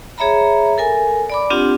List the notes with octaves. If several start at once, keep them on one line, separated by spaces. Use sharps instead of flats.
G#4 C#5 E5 A#5 B5
A4 A#4 G#5
D5 B5 D6
C4 D4 F4 G4 F#5